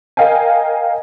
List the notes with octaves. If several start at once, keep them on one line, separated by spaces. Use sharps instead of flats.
A#4 D#5 F5 G5 G#5